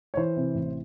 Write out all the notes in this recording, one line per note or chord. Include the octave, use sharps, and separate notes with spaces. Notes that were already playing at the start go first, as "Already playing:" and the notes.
C#5
E3 C5
C3
A1